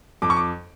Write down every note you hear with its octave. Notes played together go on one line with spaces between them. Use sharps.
F2 D6
C#6
D6